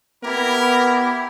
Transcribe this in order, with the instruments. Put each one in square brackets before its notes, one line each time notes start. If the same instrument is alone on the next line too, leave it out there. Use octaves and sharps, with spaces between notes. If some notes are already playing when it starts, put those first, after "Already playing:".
[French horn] B3 [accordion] E4 G4 [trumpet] A#4